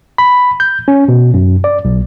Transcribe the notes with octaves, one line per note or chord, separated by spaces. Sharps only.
B5
G6
C#4
B2
F#2
D5
B1